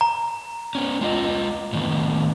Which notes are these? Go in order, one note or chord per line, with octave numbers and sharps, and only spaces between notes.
A#5
B3 C#4
G#3 F4 D#5
A2 D#3 B3